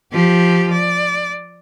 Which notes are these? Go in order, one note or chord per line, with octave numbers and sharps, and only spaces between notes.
F3 G4
D5